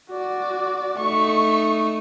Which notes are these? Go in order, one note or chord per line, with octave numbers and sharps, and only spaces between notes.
F#4 D5
A3 D#4 C#6